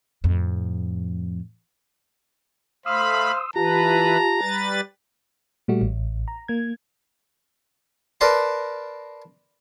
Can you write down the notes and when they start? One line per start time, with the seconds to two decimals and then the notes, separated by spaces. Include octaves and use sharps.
0.24 F2 A2
2.86 A3 C5 F5 B5 C6 D#6 E6
3.56 E3 F4 G4 B4 A5 A#5
4.41 G3 B4 A6
5.68 A#2 G3 A3 F#4
5.81 A1
6.28 A#5
6.48 A#3 G#6
8.21 A#4 B4 D5 A5 C6